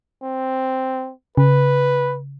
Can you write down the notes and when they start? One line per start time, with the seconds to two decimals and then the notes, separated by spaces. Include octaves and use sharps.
0.23 C4
1.37 C#3 B4